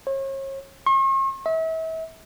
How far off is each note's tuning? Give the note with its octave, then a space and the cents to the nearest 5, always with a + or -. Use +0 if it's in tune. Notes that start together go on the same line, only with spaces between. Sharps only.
C#5 -40
C#6 -45
E5 -35